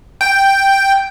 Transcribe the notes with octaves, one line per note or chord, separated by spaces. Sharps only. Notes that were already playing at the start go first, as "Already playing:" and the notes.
G5